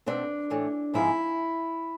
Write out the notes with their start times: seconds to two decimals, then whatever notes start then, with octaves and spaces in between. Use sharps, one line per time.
0.06 B2 A3 C4 D4
0.50 A2 E3 A3
0.94 G#2 F3 G#3 C4 E4